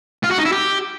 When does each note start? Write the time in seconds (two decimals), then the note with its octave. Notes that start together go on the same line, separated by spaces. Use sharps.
0.24 F4
0.31 F#4
0.38 D#4
0.45 E4
0.52 G4